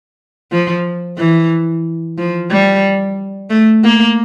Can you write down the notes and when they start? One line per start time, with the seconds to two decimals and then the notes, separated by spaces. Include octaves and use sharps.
0.52 F3
1.18 E3
2.18 F3
2.51 G3
3.50 A3
3.84 A#3